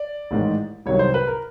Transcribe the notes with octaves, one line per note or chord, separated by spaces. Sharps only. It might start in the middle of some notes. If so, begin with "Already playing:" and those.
Already playing: D5
A1 G#2 D#3 G#3
C2 C3 D#3 F#3 C#5
C5
B4
A#4